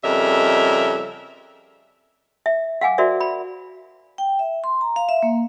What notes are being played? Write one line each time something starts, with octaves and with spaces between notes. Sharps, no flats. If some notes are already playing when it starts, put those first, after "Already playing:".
F2 C#3 G3 A#4 D#5 E5
E5
F5 F#5 G#5 D6
F#4 A#4 C5 D5 E5
B5
G5
E5
C6
A#5
F5
E5
A#3